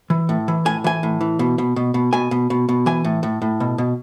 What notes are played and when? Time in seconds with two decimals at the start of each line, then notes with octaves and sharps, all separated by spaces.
0.10 E3
0.29 A2
0.48 E3
0.65 A2 G#5
0.84 E3 G#5
1.03 A2
1.21 E3
1.39 B2
1.58 B2
1.76 B2
1.94 B2
2.13 B2 G#5
2.31 B2
2.50 B2
2.69 B2
2.86 E3 G#5
3.05 A2
3.23 A2
3.42 A2
3.60 B2
3.78 B2